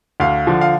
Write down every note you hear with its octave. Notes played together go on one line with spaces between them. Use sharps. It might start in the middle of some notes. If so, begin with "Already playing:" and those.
D2 F5
D3 F3
F5